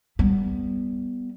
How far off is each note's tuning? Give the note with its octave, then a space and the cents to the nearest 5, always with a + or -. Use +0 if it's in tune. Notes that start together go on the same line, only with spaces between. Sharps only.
G3 +0 B3 +0